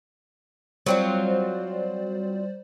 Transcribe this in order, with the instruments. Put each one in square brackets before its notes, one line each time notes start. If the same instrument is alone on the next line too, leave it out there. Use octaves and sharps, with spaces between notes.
[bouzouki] F#3 C4 F4 [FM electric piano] G3 C5 D5